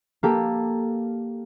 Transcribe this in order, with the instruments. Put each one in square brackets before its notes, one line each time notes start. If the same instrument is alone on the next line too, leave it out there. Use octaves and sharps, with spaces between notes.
[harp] A#3 G4 A4